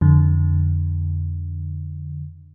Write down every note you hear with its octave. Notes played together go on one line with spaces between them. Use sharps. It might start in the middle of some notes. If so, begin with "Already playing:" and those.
F2 D3